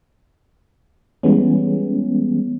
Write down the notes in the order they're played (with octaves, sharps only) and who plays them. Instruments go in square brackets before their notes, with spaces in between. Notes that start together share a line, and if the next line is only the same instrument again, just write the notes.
[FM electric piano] E3 G3 G#3 B3 C#4